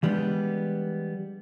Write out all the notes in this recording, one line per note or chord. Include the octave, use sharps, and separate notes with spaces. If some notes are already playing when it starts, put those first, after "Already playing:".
E3 G3 G#3 B3 D4